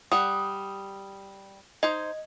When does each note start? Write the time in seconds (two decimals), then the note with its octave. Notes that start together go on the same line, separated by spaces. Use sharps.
0.12 G3 F#5 D#6
1.83 D#4 C5 D#5